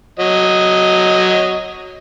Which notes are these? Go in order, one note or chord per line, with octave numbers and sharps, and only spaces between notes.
F#3 D#5